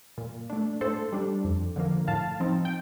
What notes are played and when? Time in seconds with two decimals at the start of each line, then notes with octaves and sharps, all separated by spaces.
0.18 A#2
0.50 A3 D4
0.81 A2 A4 C5
1.12 G3 D4
1.45 F2
1.76 D3 F3 A#3
2.08 A2 F5 A5
2.40 F3 C4 D#4
2.65 G5